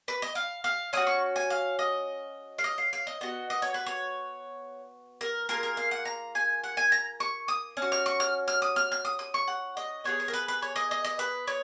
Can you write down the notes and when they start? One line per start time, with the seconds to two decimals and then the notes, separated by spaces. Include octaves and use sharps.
0.08 B4
0.22 D#5
0.35 F5
0.64 F5
0.93 C#4 F#4 D#6
1.07 C#6
1.36 G#5
1.50 F5
1.79 D#5
2.58 F5
2.64 D#5
2.78 F5
2.93 F5
3.07 D#5
3.21 B3 F#4 D#5
3.50 D#5
3.62 C#5
3.74 B4
3.86 C#5
5.21 A#4
5.49 A#3 F4 G#4 A#4
5.63 A#4
5.77 F5
5.91 F#5
6.05 A#5
6.35 G#5
6.64 F#5
6.77 G#5
6.92 A#5
7.20 C#6
7.48 D#6
7.77 C#4
7.82 F#4
7.92 F6
8.06 C#6
8.20 F6
8.48 F6
8.62 D#6
8.76 F6
8.92 F6
9.05 D#6
9.19 D#6
9.34 C#6
9.48 F#5
9.77 D#5
10.04 B3 F4 G#4 C#5
10.20 C#5
10.28 A#4
10.34 B4
10.48 B4
10.62 C#5
10.76 D#5
10.91 D#5
11.05 D#5
11.19 B4
11.47 C#5